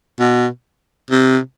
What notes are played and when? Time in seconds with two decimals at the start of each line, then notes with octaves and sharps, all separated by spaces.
0.20 B2
1.11 C3